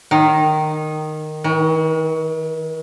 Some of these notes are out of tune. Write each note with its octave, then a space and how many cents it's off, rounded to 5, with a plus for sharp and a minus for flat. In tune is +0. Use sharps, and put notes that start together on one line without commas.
D#3 -10
D#3 +45